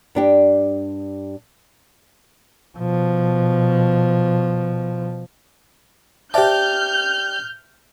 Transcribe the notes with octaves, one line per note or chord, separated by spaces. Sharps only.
G2 D4 G4
B2 F3
G4 C5 D5 E5 A5 F6 G6